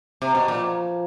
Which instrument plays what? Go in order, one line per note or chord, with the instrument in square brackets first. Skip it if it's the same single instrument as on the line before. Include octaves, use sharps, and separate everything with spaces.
[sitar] C3
B2
[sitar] A#2 [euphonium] F3